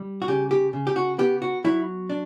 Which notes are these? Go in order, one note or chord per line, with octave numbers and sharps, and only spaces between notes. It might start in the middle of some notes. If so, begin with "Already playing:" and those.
Already playing: G3
F#4
C#3 G4
G4
C#3
G4
F#4
B3 G4
F#4
F#3 E4
D4